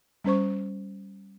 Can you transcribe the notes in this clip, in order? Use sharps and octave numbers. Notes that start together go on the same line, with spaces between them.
G3 C#4 C5 C#6